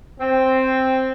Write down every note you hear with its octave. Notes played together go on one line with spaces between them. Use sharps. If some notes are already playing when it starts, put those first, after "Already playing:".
C4